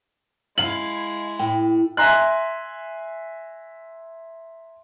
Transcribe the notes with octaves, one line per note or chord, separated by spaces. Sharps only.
G#3 E4 F5 F#7
A2 G5
E5 G#5 A#5 C6 F#6